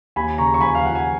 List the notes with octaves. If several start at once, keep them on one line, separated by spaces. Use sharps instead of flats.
D#2 G#5 B5
C#3 A#5 C#6
C#6
F3 G#5 B5
F5
F3 F#5
G#5